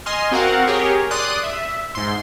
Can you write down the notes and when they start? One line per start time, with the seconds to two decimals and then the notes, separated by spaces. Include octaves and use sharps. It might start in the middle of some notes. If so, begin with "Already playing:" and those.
0.06 D#5 G#5 C6 F6
0.31 C4 F#4 A#4 F5 F#5
0.67 G4 G#4 A#4 C#5
1.11 D5 C6 D#6 F#6
1.43 E5
1.95 G#2 C6